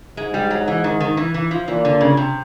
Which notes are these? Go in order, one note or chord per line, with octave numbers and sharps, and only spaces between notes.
G#2 G#3
G3
F#3
E3
D#3
D#3
E3
E3
F3
A#2 E3
D3
C#3
C3